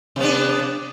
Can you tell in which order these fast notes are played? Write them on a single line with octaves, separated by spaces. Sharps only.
C3 B3 D4